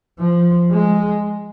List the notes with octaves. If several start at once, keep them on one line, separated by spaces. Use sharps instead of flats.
F3
G#3